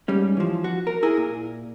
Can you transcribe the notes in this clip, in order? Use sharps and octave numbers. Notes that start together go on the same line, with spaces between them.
G#2 G3 C#4
E3 F3
F#4
A#4
E4 G#4 A#4
A#2